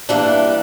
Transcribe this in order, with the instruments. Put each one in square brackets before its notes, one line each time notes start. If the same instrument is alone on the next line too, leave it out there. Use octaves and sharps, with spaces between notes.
[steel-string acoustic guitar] G2 E3 G3 A#3 D4